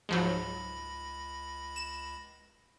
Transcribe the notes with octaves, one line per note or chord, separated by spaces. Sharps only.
C#2 G#2 F3 F#3 B5 A#6
E7